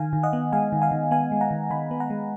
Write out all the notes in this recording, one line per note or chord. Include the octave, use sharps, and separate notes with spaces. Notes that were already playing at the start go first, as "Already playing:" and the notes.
Already playing: D#3 F5 G#5
D#3
D#5 F#5
B3
G#3 F5 G#5
D#3
F5 G#5
D#3
B3 F5 G#5
G#3
F#5 A#5
D#3
D#3 G#5 B5
B3
F#5 A#5
G#3